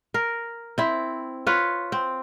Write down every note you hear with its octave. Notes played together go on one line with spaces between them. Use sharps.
A#4
C4 E4
F4 B4 C#5
C4